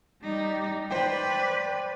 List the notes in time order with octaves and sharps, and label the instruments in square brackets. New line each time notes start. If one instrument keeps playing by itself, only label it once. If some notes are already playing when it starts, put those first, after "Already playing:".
[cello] G3 D#4
[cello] B4 D5 [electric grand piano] C5 G5